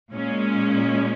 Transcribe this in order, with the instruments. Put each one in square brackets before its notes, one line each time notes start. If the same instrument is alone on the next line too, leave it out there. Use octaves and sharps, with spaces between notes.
[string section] A#2 G#3 C#4